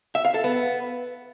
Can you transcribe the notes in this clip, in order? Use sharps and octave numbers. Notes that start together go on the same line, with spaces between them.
E5
F5
A4
B3